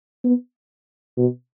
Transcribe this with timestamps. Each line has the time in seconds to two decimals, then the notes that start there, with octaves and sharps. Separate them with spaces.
0.24 B3
1.17 B2